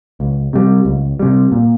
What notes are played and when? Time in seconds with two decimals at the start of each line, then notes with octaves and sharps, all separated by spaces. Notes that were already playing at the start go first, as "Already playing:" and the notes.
0.20 C#2
0.53 C3 G3
0.85 C#2
1.20 C3 G3
1.52 A#2